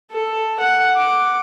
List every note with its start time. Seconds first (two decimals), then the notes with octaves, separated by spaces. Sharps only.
0.11 A4
0.60 F#5
0.96 D6